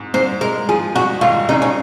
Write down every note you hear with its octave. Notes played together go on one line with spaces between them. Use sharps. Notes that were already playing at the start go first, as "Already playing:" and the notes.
Already playing: G#2
G#2 C5
G#3 A#4
F3 G#4
G#2 F#4
G#1 F4
C#3 D#4
C#4